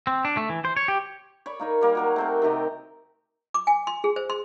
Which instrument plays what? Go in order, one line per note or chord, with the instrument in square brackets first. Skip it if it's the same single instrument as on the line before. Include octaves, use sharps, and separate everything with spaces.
[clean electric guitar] C4
D4
A3
E3
C5
C#5
G4
[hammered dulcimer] C#5 D5 B5
A#3 D#4 C#5
G3 A#3
F#3 A#3 F#4
A3 C4 A#4
C3 D#3 G4 D#5
[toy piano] D6
G#5
C6
G#4
C5
C6